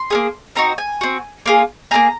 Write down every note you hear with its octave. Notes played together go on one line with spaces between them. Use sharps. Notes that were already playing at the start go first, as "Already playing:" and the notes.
Already playing: C6
A#3 C#4 G#4
C4 D#4 F#4 A#5
G#5
C4 F#4
A#3 F4 G#4
A#3 F4 G#4 A#5